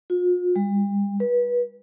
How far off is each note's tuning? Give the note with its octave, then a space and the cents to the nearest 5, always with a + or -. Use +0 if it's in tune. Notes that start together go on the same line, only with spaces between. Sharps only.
F4 +45
G3 +40
B4 -25